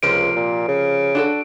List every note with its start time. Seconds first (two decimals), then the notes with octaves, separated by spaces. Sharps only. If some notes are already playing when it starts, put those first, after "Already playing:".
0.03 C#2 C3 F3 A#3 D7
0.36 A#2
0.68 C#3
1.15 D4 F#4 A4